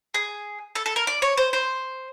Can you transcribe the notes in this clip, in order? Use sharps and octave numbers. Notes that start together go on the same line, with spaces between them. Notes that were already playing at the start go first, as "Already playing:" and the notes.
G#4
A4
A4
A#4
D5
C#5
C5
C5